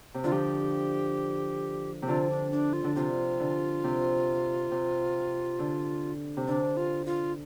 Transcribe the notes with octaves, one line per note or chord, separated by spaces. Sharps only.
C3
D3 F4
F3 G4
C3
D3 F4
D4
D4
F4
D3
C3 F4
D3
C3
C3
D3
C3
D3 D4
F4
F4